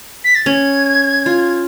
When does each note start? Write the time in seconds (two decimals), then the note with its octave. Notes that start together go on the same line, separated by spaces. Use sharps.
0.24 B6
0.35 A6
0.46 C#4 G#6
1.26 F4